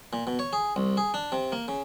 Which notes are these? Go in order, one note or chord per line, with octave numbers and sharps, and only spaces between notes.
A#2
B2
C#5
G#4
C2
G#4
D4
C3
A#3
C#3